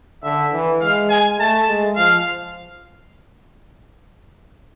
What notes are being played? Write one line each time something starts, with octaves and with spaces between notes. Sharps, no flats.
D3 E5
E3
G#3 F5
G#5
A3 A5
G#3
F3 F5